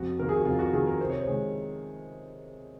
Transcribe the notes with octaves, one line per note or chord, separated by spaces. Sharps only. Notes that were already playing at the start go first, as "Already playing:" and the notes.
Already playing: F2 F#4
D#3 A#3 A#4
G#4
F#4
F2 F4
F#4
D#3 A#3 G#4
A#4
C3 C5
C#5
C5
D#3 G#3